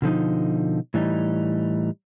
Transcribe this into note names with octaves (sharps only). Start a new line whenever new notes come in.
B2 D3 F3 D#4
A2 E3 G3 D#4